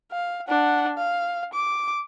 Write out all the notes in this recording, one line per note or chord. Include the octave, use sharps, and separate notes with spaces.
F5
D4 F#5
F5
D6